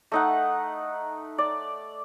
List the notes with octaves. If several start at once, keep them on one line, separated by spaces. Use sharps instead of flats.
A3 D#4 F#5
D5